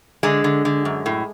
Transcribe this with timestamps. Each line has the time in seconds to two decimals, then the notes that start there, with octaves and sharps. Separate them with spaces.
0.23 D3 G#3
0.44 D3
0.65 D3
0.85 F#2
1.06 A2